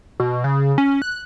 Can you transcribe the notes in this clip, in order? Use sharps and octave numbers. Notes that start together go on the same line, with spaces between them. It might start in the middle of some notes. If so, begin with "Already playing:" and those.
B2
C#3
C#4
F#6